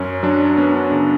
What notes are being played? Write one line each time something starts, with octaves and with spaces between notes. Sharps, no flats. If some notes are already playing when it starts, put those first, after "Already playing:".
Already playing: F#2 C#4
F#3 D4
B3 C#4
D4
C#3 D4